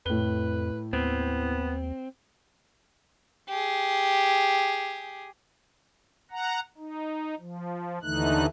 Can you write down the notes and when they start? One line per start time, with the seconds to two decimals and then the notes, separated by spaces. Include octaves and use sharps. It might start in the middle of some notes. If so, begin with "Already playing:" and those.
0.06 F2 A2 B4 G7
0.93 D#2 B3 C4
3.48 G4 G#4
6.31 F#5 A#5
6.78 D#4
7.39 F3
8.02 D#2 D3 E3 A3 D#4 F#6